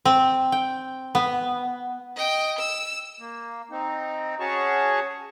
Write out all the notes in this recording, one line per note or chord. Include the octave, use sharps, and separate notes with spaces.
C4
G5
B3
D#5 G5
E6
A#3
C4 D#4
C#4 F#4 G#4 C#5 A5 C#6